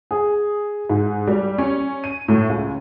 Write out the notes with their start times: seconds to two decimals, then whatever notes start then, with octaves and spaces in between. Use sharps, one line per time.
0.11 G#4
0.90 G#2
1.27 G3
1.58 C#4
2.04 D#7
2.28 A2
2.49 C#2